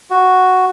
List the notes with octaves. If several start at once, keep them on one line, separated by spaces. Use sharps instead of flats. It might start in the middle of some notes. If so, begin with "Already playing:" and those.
F#4